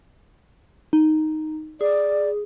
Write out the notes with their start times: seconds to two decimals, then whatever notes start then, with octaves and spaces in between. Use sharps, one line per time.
0.93 D#4
1.81 G#4 D5